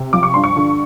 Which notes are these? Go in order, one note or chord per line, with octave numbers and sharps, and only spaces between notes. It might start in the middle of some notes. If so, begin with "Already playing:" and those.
Already playing: C3
F3 D6
C#6
G2 C6
C#6
D3